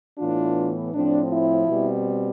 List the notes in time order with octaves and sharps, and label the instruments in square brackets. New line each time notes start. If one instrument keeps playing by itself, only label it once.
[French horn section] A2 E3 B3 D4 F4
A2 F3 C4 D4
E4
B2 G3 C4